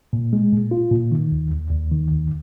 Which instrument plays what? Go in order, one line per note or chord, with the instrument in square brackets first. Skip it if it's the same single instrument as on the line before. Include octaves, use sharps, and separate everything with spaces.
[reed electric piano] A#2
G#3
A#2
F4
A#2
D#3
D#2
D#2
D#2
D#3
D#2